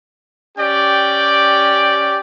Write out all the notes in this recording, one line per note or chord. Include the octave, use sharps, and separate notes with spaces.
C#4 G4 D5 G5